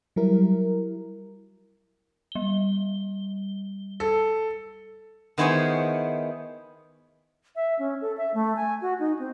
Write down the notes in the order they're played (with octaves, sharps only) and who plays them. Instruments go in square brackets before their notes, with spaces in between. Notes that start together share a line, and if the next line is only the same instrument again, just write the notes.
[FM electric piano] F#3 G3 E4 A#4
[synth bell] G3 G7
[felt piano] A4
[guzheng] D#3 B3 E4 G#4 C5 C#5
[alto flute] E5
C#4
A4
E5
A3
G#5
F#4
D#4
C4